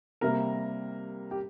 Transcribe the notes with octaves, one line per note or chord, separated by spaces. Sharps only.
C3 G3 A#3 A#4
G4